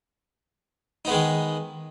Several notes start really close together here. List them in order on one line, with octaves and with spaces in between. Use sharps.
D#4 B3 G#3 D#3